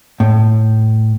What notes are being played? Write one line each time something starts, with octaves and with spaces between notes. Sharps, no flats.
A2